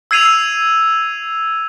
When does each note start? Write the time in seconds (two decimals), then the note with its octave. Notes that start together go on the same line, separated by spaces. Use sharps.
0.11 E6 G#6 C7 D#7 F7